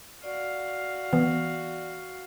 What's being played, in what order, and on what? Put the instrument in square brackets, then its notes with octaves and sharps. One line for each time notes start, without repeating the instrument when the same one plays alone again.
[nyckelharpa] F#4 F5 [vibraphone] D5
[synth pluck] E3 B3